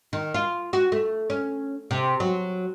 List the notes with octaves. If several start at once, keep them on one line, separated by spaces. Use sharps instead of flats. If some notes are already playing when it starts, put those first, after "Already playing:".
D#3
F4
F#4
A3
C#4
C3
F#3